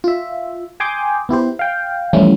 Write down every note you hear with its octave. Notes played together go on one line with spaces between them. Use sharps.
F4 E5
G5 G#5 C6 D6 D#6 G6
B3 E4 G4 C5
F5 G5
E3 F3 G3 A3 C#4 E4